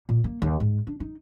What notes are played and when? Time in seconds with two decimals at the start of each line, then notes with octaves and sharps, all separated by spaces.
0.09 A#2
0.24 A#3
0.42 D#2
0.60 G#2
0.87 D4
1.00 D#4